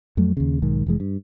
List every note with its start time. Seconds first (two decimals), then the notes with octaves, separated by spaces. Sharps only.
0.17 F2 F#3 A3
0.37 D#2 C#3
0.62 B1 G#2 D#3
0.87 F1 E3 G#3
1.00 G2